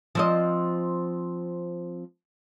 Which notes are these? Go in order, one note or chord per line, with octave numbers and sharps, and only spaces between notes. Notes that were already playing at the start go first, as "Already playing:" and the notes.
F3 C4 D#5